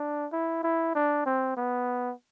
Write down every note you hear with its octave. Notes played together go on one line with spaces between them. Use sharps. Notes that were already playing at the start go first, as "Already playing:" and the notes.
Already playing: D4
E4
E4
D4
C4
B3